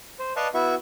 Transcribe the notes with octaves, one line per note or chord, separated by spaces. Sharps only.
C5
B4 D5 D#5 F5 A5 C#6
B3 E4 F#4 E5 C#6